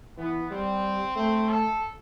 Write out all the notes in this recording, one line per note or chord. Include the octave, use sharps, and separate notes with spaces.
E3 B3
G3 C4
A3 C4
A4